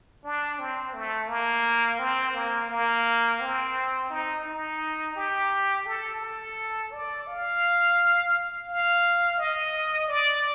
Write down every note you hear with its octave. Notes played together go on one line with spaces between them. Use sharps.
D4
C4
A3
A#3
C4
A#3
A#3
C4
D#4
D#4
G4
A4
A4
D5
F5
F5
D#5
D5